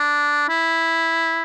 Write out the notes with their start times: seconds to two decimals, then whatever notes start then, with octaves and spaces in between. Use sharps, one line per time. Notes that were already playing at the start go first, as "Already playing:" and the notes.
Already playing: D4
0.49 E4